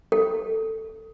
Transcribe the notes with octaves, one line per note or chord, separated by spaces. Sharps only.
A4